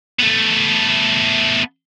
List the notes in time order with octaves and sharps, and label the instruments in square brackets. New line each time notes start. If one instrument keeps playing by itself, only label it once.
[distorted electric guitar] A3 B3